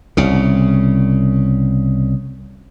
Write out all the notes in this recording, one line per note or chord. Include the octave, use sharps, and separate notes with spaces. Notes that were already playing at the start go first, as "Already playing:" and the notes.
C2 C#3